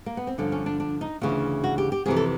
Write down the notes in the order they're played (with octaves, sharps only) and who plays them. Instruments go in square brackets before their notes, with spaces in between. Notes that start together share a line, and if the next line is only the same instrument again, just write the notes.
[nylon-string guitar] A#3
B3
C4
G2 D3 F3 C#4
C#4
D4
D4
D#4
D2 C#3 E3 F4
F#4
G4
G4
F2 C3 E3 G#4
A4